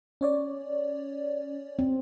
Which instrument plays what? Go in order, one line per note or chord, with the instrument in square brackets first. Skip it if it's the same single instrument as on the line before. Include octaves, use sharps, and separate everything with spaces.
[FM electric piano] C#4 C#5 D5
[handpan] C4